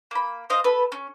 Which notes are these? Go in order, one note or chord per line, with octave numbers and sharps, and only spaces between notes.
A#3 B5
C5 D#5 F5
A4 B4
C#4